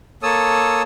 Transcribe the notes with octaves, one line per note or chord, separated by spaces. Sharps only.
A#3 A4 C#5 A5 D#6 E6